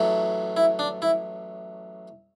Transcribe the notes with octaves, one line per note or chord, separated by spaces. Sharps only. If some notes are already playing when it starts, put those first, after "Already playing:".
Already playing: A1 A2 F#3
E4
D4
E4